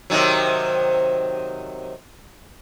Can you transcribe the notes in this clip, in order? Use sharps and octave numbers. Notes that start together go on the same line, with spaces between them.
C3 D#3 F#3